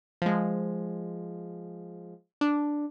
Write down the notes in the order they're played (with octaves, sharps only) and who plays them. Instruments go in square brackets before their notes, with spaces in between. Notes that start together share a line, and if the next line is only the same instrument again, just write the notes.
[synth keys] F3 G#3
D4